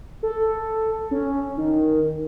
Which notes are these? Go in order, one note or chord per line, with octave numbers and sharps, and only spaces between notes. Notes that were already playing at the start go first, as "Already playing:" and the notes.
A4
C#4
D#3